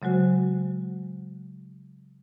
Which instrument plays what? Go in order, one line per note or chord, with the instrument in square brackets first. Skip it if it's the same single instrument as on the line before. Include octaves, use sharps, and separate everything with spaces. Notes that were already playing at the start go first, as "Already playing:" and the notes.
[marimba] C#3 F#3 G#3 F#4 C5